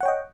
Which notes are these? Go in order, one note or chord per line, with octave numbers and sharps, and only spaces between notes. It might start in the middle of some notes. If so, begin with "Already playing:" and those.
C#5 D#5 F#5 G5